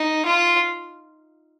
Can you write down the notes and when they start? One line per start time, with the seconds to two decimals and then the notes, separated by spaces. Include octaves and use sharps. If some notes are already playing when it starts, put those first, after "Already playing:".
Already playing: D#4
0.26 F4